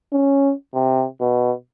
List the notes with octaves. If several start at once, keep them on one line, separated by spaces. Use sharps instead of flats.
C#4
C3
B2